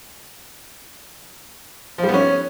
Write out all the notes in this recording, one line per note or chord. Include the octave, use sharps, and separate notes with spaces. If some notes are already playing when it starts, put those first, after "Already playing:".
F3
G3
B3
C#4